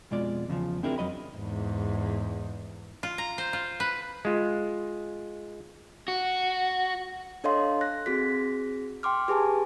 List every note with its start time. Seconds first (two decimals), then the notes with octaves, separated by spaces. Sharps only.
0.11 F2 B2 G#3 F4 D5
0.48 E2 C#3 E3 F3
0.83 C4 D4 E4 F4 G#4 A#4
0.98 F2 F#3 D#5 B5
1.38 E2 G#2
3.03 F4
3.18 A#5
3.38 C5
3.53 F4
3.80 B4
4.25 G#3 F4
6.08 F#4
7.44 D4 A4 C#5 D#5 F5 C6
7.81 F#6 A#6
8.06 C4 F#4 G#4 B6
9.03 G5 C6 D6 F6
9.28 G4 G#4 B4 G#5 A5